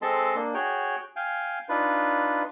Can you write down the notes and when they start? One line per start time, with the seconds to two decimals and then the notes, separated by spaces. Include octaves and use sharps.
0.02 G#3 C4 A4 D#5 A5 C6
0.36 A#3 D4
0.54 F#4 G#4 C#5 G5
1.16 F5 G5 G#5
1.69 D4 D#4 F4 B4